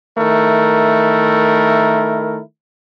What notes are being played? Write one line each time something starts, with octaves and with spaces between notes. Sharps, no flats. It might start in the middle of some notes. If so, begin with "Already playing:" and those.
D#3 A3 E4 A#4